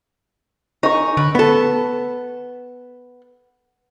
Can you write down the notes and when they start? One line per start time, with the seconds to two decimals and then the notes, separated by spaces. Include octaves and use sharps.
0.83 D#4 C#5 C#6
1.17 D3 B4
1.35 B3 A4